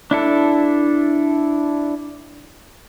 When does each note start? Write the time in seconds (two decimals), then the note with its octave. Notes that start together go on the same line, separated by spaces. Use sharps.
0.11 D4 E4 A4